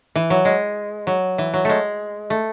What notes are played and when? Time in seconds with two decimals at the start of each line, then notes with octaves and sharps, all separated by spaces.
0.15 E3
0.30 F#3
0.45 G#3
1.07 F#3
1.38 E3
1.54 F#3
1.65 G#3 A3
2.30 A3